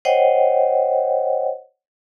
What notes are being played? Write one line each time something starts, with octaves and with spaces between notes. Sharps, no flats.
C5 C#5 D#5 F#5 G5